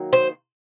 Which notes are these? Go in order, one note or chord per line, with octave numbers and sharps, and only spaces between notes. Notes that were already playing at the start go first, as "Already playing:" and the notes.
Already playing: D#3 F#3 A#3
C5